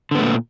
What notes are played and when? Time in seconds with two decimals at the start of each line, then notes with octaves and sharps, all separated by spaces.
0.11 D3
0.15 B3
0.19 A3
0.22 A#2